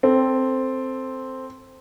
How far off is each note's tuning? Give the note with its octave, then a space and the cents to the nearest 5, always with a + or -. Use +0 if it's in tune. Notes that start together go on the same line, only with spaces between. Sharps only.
C4 +0 A4 +0